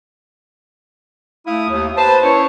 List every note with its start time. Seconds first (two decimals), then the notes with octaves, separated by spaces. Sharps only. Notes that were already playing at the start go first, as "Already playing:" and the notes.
1.47 A3 E4 F5 D#6
1.69 D#2
1.97 B4 C5 A5
2.23 C#4 E4 C5 C#5